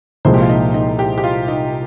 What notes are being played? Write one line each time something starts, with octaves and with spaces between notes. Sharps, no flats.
C2 A#2 F3 G#3 C5
G4
F4
D#4
D#4
G4
G4
F4
D#4